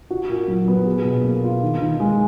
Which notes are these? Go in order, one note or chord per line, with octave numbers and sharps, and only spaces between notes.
F#4
A#2
F#3
B3
G#4
B2
A#3
F4
D#3
D#3
G#3